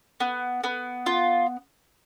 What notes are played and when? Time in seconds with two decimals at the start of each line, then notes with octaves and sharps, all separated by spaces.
0.20 B3
0.64 B3
1.06 F4